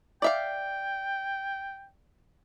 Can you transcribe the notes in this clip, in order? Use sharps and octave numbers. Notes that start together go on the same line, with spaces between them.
D5 E5 F5 G5